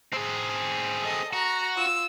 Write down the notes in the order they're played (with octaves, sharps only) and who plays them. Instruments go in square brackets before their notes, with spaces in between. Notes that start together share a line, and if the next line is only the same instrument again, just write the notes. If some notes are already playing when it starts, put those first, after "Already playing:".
[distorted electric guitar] C4 G#4
[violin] A4 D#5
[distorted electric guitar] F#4 [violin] A#5
[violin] F4 E6